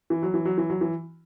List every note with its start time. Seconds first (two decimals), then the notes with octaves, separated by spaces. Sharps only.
0.10 E3
0.23 F#3
0.34 E3
0.45 F#3
0.58 E3
0.70 F#3
0.81 E3